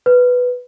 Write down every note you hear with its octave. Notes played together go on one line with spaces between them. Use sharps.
B4